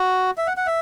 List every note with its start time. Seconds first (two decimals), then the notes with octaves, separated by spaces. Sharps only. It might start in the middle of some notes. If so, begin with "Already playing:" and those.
Already playing: F#4
0.38 E5
0.47 F#5
0.57 F#5
0.66 E5